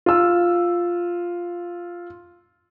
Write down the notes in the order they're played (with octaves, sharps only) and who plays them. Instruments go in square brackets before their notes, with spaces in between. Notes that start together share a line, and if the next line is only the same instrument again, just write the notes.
[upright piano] F4 E6